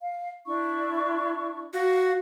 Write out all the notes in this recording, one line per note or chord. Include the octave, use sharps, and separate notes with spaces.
F5
D4 E4 C#6
F#4 F5